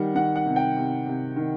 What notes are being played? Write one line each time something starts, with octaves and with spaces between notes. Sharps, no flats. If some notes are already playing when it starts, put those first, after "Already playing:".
Already playing: D#3 G3 F#5
D#3 F#5
F#5
C3
G5
C3
C3
D#3